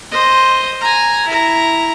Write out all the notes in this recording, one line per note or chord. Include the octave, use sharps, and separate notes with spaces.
C5 D#5
G#5 A#5
E4 A#5